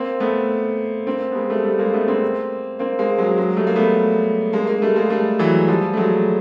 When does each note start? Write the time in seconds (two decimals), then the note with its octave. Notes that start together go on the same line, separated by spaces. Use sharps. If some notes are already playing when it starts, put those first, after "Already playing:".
Already playing: A#3 C4
0.20 A3 B3
1.07 A#3 C4
1.31 B3
1.35 G#3 A#3
1.50 G3 A3
1.65 G3 A3
1.79 G#3 A#3
1.94 A3 B3
2.08 A#3 C4
2.79 A#3 C4
2.99 G#3 A#3
3.18 F#3 G#3
3.37 F#3 G#3
3.57 G3 A3
3.67 A#3
3.76 A3 B3
4.53 G#3 A#3
4.67 G#3 A#3
4.82 G3 A3
4.96 G#3 A#3
5.10 G3 A3
5.39 E3 F#3
5.68 F3 G3
5.93 A3
5.97 F#3 G#3